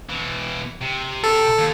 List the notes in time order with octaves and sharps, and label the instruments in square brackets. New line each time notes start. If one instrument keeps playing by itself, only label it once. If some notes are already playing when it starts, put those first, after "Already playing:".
[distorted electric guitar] B2 E3
C3
[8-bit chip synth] A4
[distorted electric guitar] D#2